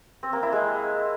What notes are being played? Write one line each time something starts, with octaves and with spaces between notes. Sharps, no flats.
C4
A#3
E4
G#3